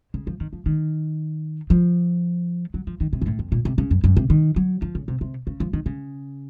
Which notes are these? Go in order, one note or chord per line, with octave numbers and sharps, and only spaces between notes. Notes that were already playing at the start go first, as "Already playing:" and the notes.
C#3
F3
D#3
F3
D#3
F3
F#3
F3
D#3
C3
F#2
A2
F2
A#2
C3
C#3
F#2
F#2
C3
D#3
F#3
F3
C#3
C3
C3
C#3
F3
D#3
C#3